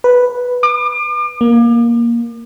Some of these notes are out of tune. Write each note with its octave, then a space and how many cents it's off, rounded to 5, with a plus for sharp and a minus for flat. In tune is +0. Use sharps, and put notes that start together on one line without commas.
B4 -5
D6 +35
A#3 +10